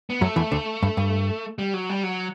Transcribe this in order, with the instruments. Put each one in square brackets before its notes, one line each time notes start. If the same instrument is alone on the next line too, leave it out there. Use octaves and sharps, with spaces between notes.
[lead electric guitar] B3
[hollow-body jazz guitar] F#2 F#3 [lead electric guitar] A3
[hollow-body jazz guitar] E2 E3
D2 D3
G2
G2
[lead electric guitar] G3
F#3
G3
F#3